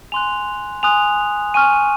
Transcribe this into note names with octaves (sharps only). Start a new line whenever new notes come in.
G#5 C6 F#6 F7
G#5 C6 D#6 F#6 F7
G#5 C#6 F6 D#7